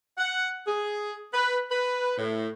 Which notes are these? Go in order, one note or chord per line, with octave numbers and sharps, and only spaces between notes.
F#5
G#4
B4
B4
A2